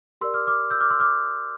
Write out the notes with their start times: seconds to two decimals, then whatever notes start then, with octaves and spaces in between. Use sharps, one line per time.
0.21 G4 A#4 D5 C6 E6
0.34 D6 F6
0.47 D6 F6
0.70 E6 G6
0.80 D6 F6
0.90 C6 E6
1.00 D6 F6